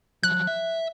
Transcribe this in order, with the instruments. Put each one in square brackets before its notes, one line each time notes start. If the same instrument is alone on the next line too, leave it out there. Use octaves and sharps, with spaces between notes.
[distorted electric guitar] F3 F#3 [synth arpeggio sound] F#6
[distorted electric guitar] E5